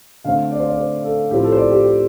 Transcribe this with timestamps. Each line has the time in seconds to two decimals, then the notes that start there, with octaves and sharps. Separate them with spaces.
0.24 D3 A3 C4 F5
0.51 D5
0.60 C5
0.68 D5
0.78 C5
1.04 A4
1.31 A2 F3 C4 G4
1.44 A4
1.52 C5
1.57 D5
1.71 G4
1.84 G4